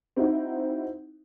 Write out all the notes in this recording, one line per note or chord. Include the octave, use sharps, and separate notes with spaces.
C4 D#4 E4 F#4